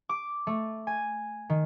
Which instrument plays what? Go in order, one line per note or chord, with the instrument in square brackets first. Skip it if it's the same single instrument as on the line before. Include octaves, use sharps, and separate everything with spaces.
[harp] D6
A3
G#5
D#3